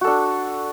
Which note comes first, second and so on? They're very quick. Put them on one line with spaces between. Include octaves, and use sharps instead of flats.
F#4 A4 D4